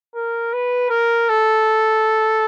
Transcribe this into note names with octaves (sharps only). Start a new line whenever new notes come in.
A#4
B4
A#4
A4